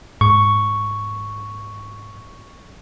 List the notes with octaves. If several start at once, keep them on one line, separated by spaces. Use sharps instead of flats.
G#2 C#6